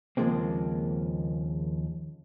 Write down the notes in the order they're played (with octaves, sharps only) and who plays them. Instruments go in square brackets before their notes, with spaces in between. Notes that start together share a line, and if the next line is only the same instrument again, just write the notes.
[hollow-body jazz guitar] D#2 C#3 F3 G#3 A#3 C4